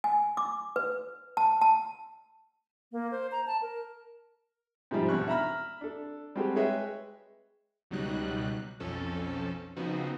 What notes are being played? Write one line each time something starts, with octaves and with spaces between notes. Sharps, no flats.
G#5
D6
B4
A5
A5
A#3
C5
A#5
A5
A#4
G#2 C3 F3 G3 C4
B1 E2 D4 C#6 F#6
E5 A#5 B5 F6
D4 A4
G3 G#3 C4 F#4 G4 A4
G#3 G#4 B4 C#5 E5 G5
C#2 B2 F#3 G3 D#4 F#6
B1 F2 F3 C#4 A4
C#3 F3 B3 C4 D#4 F#4